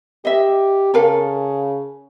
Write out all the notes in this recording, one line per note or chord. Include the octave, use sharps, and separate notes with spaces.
G4 D#5 E5
C#3 A4 A#4 F5